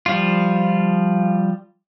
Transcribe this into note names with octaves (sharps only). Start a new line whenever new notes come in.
F3 G3 F4